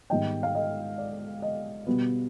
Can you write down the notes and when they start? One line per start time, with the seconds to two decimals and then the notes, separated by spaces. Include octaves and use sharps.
0.10 G#2 D#3 G3 B3 D#5 G5
0.43 F5
0.55 D#5
0.98 D5
1.42 D#5
1.87 B2 G3 B3